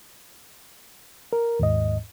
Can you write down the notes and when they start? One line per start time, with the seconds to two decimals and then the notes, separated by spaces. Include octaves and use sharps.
1.33 A#4
1.59 D#2 G#2 D#5